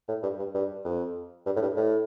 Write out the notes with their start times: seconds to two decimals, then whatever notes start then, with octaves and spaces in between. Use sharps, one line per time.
0.08 A2
0.23 G2
0.39 G2
0.55 G2
0.85 F2
1.46 G2
1.56 A2
1.62 G2
1.77 A2